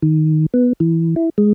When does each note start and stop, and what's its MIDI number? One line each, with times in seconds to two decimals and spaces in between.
0.02 0.46 51
0.54 0.73 59
0.80 1.15 52
1.16 1.29 64
1.38 1.53 56